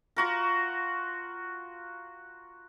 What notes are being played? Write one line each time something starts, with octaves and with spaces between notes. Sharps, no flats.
F4 F#4 A#4